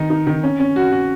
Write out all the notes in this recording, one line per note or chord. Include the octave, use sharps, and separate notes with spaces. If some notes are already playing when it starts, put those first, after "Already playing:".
Already playing: D#3 D#4
D#4
D#3
C#4
C#4
F#4
F#4